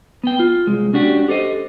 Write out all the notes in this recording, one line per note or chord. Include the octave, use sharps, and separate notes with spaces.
B3 G5
F4
C2 G#3
C#4 D4 F#4 G4
G4 A4 C5 D#5